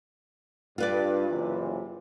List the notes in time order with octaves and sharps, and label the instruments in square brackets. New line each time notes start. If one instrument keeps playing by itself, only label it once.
[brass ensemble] G2 [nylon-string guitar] F4 B4 D5
[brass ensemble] F#1 C3 E3